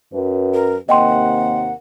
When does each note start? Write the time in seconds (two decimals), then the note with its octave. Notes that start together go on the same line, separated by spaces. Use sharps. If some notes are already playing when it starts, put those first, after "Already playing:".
0.14 F#2 B4
0.54 A#4
0.89 D#2 C3 A#3 D#5 F#5 G5 C6